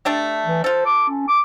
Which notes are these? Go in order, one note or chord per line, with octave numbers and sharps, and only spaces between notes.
A3 D4 G4
E3
F4 A4 C5
D6
C#4
D6